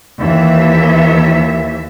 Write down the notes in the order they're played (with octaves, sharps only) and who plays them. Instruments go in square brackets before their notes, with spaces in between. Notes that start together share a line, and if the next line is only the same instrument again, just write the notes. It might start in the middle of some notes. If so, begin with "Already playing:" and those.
[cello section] D#2 E3 E5